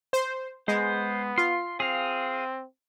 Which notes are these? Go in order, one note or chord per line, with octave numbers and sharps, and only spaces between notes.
C5
G#3 B3 C5
F4 C6
C4 G#4 F5